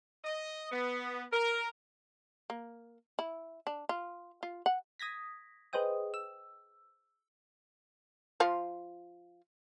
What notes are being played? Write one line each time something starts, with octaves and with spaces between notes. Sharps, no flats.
D#5
B3
A#4
A#3
E4
D4
F4
F4
F#5
D#6 G#6 A#6 B6
G#4 B4 C5 D#5 G5 D#6
E6
F3 F4 F5